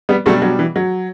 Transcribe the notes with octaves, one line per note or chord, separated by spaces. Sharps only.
G3 B3
B2 F#3 G3 A3 D4
F#3
E3
F#3